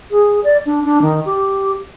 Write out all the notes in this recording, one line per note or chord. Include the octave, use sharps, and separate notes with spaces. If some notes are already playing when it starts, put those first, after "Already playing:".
G#4
D5
D4
D4
D#3
G4